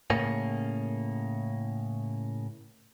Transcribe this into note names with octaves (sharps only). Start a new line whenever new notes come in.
A2 C#3 A#3 C#4